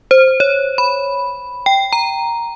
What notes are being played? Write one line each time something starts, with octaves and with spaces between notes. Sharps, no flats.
C5
C#5
B5
G5
A#5